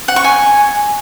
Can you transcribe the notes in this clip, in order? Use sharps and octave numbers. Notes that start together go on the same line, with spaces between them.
F#5
C#6
G#5